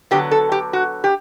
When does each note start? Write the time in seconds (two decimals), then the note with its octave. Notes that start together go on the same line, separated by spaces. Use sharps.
0.11 D3 F#3 B3 G4
0.31 A4
0.52 G4
0.73 F#4
1.04 G4